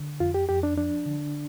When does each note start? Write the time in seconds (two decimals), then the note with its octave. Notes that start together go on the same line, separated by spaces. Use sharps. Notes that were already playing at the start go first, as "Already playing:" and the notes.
Already playing: D3
0.20 F2 F4
0.34 G4
0.49 F2 G4
0.63 D4
0.77 F3 D4
1.06 D3